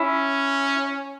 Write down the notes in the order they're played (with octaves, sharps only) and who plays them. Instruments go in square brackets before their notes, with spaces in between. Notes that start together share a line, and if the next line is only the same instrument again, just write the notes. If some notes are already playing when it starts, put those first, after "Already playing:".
Already playing: [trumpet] C#4 [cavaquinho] E4